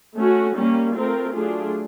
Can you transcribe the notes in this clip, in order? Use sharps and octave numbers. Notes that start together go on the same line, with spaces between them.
A3 C#4 F#4
G3 A#3 C#4
A3 C4 F4 A#4
F#3 A3 D4 F4 G#4